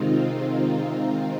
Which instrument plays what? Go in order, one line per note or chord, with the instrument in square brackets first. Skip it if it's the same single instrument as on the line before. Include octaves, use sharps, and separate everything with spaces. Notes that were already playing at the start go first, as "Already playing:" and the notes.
Already playing: [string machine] C3 D#3 G#3 C4 D#4 F4